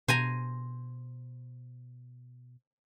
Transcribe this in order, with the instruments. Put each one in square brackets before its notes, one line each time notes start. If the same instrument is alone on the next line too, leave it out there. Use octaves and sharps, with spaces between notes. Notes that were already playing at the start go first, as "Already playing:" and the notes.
[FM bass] B2 [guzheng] C5 G#5 A#5